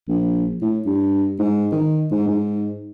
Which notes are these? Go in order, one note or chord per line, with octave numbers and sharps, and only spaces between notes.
A#1
A2
G2
G#2
D#3
G#2
G#2